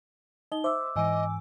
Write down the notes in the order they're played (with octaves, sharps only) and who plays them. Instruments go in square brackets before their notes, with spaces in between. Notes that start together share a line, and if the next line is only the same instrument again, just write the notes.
[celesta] D#4 G7 [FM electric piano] D#5
[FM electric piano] C5 E5 [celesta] D6 E6
[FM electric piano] G#2 E3 D6 [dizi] D#5 [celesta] G#5 E6